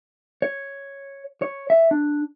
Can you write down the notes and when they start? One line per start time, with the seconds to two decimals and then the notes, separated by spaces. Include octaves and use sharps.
0.42 C#5
1.42 C#5
1.70 E5
1.91 D4